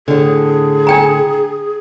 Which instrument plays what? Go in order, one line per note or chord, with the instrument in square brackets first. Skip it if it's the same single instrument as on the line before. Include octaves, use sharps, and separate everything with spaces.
[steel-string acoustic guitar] A2 D3 [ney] G#4
[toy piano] D4 G5 A#5